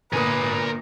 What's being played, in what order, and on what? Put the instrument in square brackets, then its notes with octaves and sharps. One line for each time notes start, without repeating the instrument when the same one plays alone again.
[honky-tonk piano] G1 A#2 D#6 [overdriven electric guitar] A#4 G#5 [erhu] B4